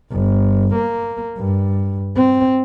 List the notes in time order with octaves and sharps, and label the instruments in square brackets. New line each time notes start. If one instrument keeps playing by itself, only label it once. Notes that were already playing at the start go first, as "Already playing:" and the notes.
[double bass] G1
A#3
G2
C4